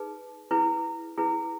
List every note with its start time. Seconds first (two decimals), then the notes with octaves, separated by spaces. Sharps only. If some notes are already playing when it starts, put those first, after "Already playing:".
Already playing: D#4 G#4 B4
0.51 E4 G#4 B4
1.18 E4 G#4 B4